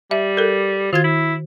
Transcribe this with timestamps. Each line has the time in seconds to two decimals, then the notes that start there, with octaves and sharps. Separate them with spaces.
0.11 G3 E5
0.37 A4 A#4
0.93 D#3 F4 F#4 G#6
1.04 E4